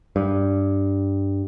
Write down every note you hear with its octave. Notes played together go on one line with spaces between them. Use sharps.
G2